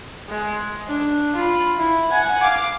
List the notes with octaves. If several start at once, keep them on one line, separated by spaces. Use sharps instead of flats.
G#3
D4
F4 B5
E4
F#5 G#5
F5 D6